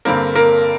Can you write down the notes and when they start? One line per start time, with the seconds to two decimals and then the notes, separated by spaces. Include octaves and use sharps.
0.05 G2 D3 G3 A#3 C4 A#4
0.35 A#3 A#4